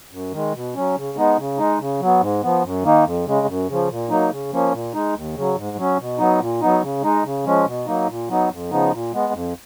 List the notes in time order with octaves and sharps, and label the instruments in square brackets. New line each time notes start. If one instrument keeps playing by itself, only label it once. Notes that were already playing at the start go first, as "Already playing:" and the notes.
[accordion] F#2
D#3 G#3
B2
F#3 C#4
C#3
G#3 B3 D#4
C#3
G#3 D#4
C#3
F#3 B3
G#2
F3 B3
F#2
D#3 A#3 D#4
F2
C#3 G#3
F#2
C#3 F3
A#2
F#3 A#3 D#4
C#3
F3 A#3 C#4
A#2
G#3 D#4
D#2
C#3 F#3
G#2
F#3 C#4
B2
F#3 B3 D#4
A#2
F#3 B3 D#4
C#3
G#3 D#4
C#3
F3 G#3 C#4
B2
F#3 A#3 D#4
A#2
F#3 B3 D#4
F2
C#3 F3 B3 D#4
A#2
G#3 B3
F2